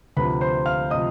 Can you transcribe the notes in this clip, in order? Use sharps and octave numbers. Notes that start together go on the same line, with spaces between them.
D2 C3 F3 B4 B5
C5 C6
F5 F6
C3 F3 D#5 D#6